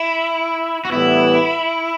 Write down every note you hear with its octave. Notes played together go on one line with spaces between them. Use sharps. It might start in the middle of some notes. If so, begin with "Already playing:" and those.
Already playing: E4
F#4
A2 E3 G3 B3 E4